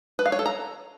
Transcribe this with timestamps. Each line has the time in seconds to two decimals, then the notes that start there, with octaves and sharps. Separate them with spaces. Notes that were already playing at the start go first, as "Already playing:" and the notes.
0.19 B4
0.26 F5
0.32 C#5
0.39 A4
0.46 A#5